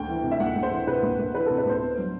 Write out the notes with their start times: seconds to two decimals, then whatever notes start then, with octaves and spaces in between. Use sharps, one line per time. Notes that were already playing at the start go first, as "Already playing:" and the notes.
Already playing: D2 G5
0.08 E3
0.23 C3
0.31 E5
0.40 D2 F#5
0.55 D2
0.63 C5
0.71 E3
0.87 C3 B4
1.02 D2
1.18 D2
1.34 E3 B4
1.46 C3 A4
1.58 B4
1.65 D2 C5
1.82 B3
1.98 F#3